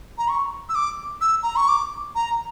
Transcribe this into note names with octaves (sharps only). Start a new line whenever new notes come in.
A#5
C#6
E6
D6
E6
A#5
C#6
D6
A#5